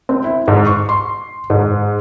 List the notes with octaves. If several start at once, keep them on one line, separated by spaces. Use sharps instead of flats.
C4
E4
G#2
C#6
C6
G#2